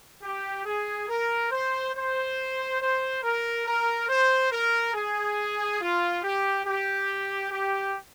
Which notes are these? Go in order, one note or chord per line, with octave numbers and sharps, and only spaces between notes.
G4
G#4
A#4
C5
C5
C5
A#4
A#4
C5
A#4
G#4
F4
G4
G4
G4